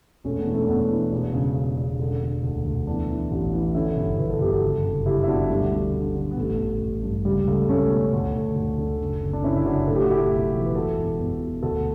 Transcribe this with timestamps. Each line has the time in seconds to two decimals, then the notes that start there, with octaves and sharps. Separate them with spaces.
0.24 E1 A3 C#4
0.38 B3 D4
0.46 E3
0.54 A3 C#4
0.68 E2 B3 D4
0.90 E3
1.12 E1
1.34 C#3
1.55 C#3
1.77 E1
1.99 D3
2.21 D3
2.43 D2
2.65 D2
2.87 E3 B3 D4
3.09 E3
3.31 A1
3.52 E3
3.74 D3 C#4 E4
3.96 G1
4.18 G1 B4
4.30 A4
4.40 G1 G4
4.52 F#4 A4
4.63 F#1
4.84 F#1
5.06 F#1 E4 G4
5.23 E4
5.28 B2 D4 F#4
5.49 D2 G3
5.72 D3
5.94 D3
6.15 D3
6.31 B3
6.37 A1 A3
6.59 A1
6.81 A1
7.03 G2
7.25 C#2 G3
7.47 C#2 A3
7.69 C#2 A3 C#4
7.91 B2
8.13 D2
8.34 D2
8.56 D2
8.79 D3
9.00 F#1
9.22 F#1
9.33 D4
9.43 F#1 C#4 E4
9.56 E4
9.66 F#1 D4 F#4
9.87 A2 A4
9.95 G4
10.03 F#4
10.10 A2 E4 G4
10.32 B1
10.53 E3
10.65 B4
10.75 E1 F#4 A4
10.97 E2
11.19 E2
11.40 B2
11.63 D2 F#4 A4